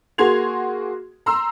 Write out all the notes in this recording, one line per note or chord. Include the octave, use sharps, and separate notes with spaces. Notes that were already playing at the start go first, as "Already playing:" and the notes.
A#3 F#4 G#4 C6 G#6 F7
A#5 C6 E6